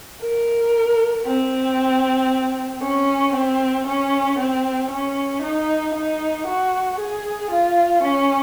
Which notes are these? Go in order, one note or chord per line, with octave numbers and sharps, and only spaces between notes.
A#4
C4
C#4
C4
C#4
C4
C#4
D#4
D#4
F#4
G#4
F4
C#4